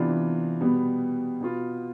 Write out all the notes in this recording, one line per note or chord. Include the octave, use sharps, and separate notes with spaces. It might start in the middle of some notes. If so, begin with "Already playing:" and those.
Already playing: C3 E3 B3 D4 F4
B2 G3 B3
B2 B3 F4